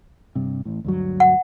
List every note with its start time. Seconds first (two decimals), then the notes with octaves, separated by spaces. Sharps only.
0.35 G2 C3
0.65 A1 A2
0.85 D2 G2 F#3
1.20 F#5